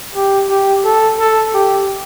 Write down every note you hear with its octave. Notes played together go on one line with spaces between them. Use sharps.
G4
G4
A4
A4
G4